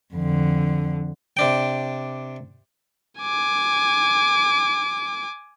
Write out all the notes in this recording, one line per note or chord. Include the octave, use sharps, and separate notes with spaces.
F2 D3
C3 D4 G5
G#5 D6